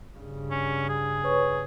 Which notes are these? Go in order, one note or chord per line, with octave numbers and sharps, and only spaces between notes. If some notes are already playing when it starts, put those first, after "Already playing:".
G2 C#3
C#4
G#4
B4 C#5 C#6